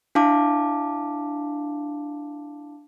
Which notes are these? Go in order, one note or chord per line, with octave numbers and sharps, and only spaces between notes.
D4 E4 F5 A5 D6